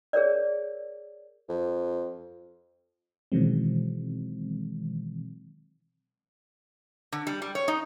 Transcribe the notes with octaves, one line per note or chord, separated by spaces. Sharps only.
G#4 A#4 C#5 D5
F2
B2 D#3 E3 F#3 G#3 C4
D3
G3
G3
C#5
D#4